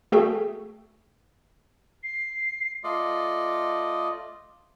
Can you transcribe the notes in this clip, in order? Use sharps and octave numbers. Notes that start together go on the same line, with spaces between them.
A3 F#4 G#4 A4 E5 G5
C7
A3 F4 D5 D#5